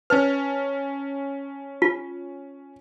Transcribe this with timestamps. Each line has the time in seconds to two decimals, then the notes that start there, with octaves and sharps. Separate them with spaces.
0.10 C#4 B4 A5 F6
1.82 F4